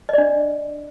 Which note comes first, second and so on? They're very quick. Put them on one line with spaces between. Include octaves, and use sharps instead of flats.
D#5 D5 D4